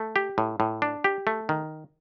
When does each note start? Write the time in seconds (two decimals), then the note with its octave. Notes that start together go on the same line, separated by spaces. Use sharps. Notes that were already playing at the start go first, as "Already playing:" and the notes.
Already playing: A3
0.16 G4
0.38 A2
0.60 A2
0.82 D4
1.04 G4
1.27 A3
1.49 D#3